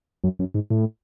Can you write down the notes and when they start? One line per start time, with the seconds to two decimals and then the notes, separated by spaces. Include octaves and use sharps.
0.24 F#2
0.39 F#2
0.54 G#2
0.70 A2